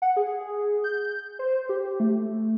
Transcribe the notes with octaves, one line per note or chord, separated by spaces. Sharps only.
F#5
G#4
G6
C5
G4
A3